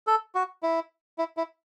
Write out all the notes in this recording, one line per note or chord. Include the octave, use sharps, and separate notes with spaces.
A4
F#4
E4
E4
E4